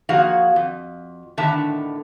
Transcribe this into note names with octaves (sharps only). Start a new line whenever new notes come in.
F3 A#3 F#4 G#4 F5 F#5
F2
A2 D3 D#3 B3 E5 A5